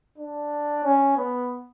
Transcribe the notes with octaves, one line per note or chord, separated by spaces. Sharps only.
D4
C#4
B3